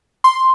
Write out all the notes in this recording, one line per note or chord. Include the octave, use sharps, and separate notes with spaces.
C6